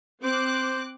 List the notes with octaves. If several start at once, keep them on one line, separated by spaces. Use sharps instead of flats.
C4 C5 D6 F#6